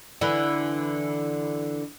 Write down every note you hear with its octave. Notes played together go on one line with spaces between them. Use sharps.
D3 E3